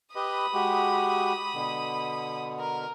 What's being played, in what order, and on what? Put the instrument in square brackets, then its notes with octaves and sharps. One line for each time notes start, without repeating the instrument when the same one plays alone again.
[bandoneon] G4 B4 D#5 [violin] B5 D#6
[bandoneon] G#3 F#4 G4
B2 D3
[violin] A#4